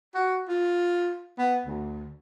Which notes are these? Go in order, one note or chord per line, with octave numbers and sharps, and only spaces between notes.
F#4
F4
B3
D2